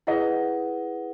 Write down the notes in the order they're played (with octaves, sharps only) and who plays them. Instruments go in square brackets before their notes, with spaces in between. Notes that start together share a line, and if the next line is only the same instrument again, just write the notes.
[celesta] E4 G#4 B4 F#5 [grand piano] D#5